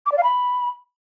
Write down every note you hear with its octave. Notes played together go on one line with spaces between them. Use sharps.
D6
D5
F5
B5